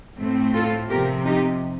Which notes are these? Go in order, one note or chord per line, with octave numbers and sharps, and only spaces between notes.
A2 A3 C4
F4 A4
C3 F3 C4 G4 A#4
D#4 G4